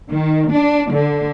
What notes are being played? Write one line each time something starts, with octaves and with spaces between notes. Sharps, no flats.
D#3
D4
D3